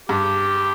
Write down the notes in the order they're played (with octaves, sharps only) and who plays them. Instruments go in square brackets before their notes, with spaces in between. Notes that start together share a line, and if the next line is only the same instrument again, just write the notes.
[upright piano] G2 [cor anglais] G4